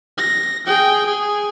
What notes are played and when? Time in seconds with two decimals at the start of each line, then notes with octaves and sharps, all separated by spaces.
0.18 A#6
0.67 G#4 G5
1.06 G#4